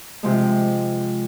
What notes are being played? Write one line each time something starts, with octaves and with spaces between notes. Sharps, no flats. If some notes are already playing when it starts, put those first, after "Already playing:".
C3 F3 G#3